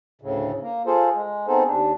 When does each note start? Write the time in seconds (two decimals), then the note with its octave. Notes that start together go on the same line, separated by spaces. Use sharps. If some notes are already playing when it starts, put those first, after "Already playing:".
0.22 D2 A2 C#3
0.62 A#3
0.86 F4 G#4 A4 C5
1.15 G#3
1.47 B3 C4 D#4 G#4 A4 C5
1.66 D#2 D4